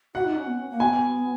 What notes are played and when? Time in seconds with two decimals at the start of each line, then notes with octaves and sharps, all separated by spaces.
0.15 F#4 F#5
0.25 D#4
0.36 C#4
0.47 B3
0.58 C#4
0.70 A#3
0.80 B3 G#5